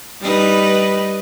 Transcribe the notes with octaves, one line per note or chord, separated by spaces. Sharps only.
G3 D#4 B4